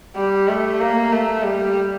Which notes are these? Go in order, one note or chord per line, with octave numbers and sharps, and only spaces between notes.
G3
A3
A#3
A3
G3